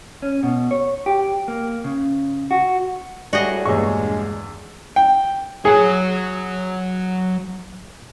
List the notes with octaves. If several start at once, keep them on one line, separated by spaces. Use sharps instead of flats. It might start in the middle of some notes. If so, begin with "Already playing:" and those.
C#4
B2
C#5
G4
A#3
C#3
F#4
A2 G3 F#4 G#4 D5 D#5
A#1 E2 G2 G#3 D4 C#5 C#6
G5
F#3 G#4 C#5